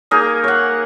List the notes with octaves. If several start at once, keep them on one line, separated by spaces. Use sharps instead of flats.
A#3 D#4 G#4 A#4
C#5 F#5